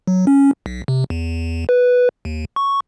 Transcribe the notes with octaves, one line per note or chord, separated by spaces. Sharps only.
F#3
C#4
B1
C3
E2
B4
D#2
C#6